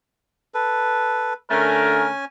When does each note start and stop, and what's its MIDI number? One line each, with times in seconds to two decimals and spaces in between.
0.54 1.33 69
0.54 1.33 71
1.51 2.08 50
1.51 2.08 57
1.51 2.25 61
1.51 2.08 70
1.51 2.25 80